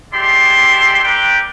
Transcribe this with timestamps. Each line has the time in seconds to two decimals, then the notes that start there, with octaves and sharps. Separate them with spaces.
0.13 G#3 E4 G4 A4 D5 C6
1.04 C4 G4 A#4 B4 D5 G5